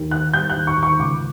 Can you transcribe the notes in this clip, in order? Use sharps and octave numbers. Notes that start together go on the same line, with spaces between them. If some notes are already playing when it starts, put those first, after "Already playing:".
Already playing: D#2
D#3 F#6
G3 G6
F#6
D#2
C#6
D#2
C#6
C#2 D6